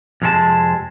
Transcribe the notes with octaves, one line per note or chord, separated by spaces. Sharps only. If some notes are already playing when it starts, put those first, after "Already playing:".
F2 C3 G#3 E4 A5